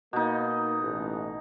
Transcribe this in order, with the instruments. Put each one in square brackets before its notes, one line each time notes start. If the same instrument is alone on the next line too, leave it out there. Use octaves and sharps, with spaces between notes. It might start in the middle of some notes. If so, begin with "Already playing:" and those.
[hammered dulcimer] B2 D#4 [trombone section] A#3
[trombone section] A1